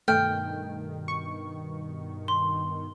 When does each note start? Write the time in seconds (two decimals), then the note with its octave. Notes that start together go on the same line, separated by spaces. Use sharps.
0.08 G2 B2 D#3 A3 G5 F6
1.08 C#6
2.28 C6